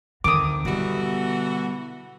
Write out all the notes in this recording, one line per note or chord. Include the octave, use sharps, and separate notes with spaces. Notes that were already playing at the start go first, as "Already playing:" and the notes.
D2 D3 D#3 C4 D6 D#6
B2 D3 E3 G3 A3 F#4